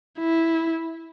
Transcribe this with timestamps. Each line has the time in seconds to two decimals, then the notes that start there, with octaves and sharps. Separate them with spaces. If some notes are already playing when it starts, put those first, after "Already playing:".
0.19 E4